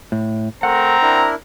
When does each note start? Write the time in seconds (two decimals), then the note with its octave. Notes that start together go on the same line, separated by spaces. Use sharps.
0.12 A2
0.63 A3 C4 A#4 F#5 A#5
1.02 D4 E4 A#4